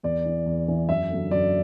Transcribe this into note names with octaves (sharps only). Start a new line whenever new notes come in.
E2 D5
E3
E2
E3
F#2 E5
D3 F#3
F#2 D5